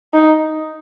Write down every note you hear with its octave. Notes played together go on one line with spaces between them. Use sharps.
D#4